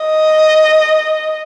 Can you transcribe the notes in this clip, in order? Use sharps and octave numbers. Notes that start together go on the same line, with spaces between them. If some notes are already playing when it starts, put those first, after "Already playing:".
Already playing: D#5